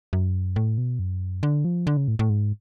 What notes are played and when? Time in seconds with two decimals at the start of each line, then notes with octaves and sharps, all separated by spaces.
0.13 F#2
0.56 A2
0.78 B2
0.99 F#2
1.43 D3
1.65 F3
1.87 D3
1.97 C#3
2.08 A2
2.19 A2
2.30 G#2